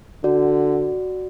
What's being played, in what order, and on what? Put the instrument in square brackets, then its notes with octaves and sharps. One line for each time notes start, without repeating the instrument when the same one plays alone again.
[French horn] D3 [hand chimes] F#4 D5